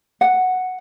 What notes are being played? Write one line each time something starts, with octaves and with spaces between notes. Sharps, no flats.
F#5